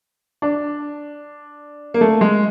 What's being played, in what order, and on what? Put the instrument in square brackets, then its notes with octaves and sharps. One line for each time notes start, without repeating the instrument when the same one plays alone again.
[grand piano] D4
A#3
A3
G#3